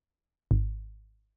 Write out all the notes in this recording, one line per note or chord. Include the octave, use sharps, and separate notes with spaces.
G#1